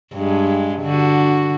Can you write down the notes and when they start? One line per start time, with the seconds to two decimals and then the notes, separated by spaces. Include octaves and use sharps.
0.14 G2 G#3
0.83 D3 F#4